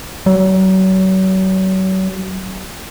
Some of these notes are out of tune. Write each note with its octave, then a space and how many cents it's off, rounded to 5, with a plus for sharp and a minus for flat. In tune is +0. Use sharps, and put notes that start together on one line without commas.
F#3 +35